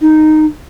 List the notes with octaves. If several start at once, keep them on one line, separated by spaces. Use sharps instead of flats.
D#4